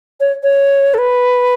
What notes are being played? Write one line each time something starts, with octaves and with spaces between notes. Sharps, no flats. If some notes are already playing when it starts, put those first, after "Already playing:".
C#5
C#5
A4
B4